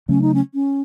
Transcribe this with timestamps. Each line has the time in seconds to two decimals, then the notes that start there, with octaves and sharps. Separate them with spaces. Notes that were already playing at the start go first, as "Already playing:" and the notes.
0.08 C#3 F#3 A3 C#4
0.22 D#4
0.34 C#4
0.54 C#4